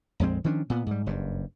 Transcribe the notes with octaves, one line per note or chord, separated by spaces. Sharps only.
A#1 F2 G#3 C4
D#3 F3 C#4 D4
A#2 B3
G#2 G3
F#1 G2